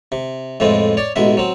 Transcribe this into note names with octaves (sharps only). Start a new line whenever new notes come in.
C3
F2 A2 E3 G#3 C4
C#5 D5
A1 B2 G#3 E5
F#3 C4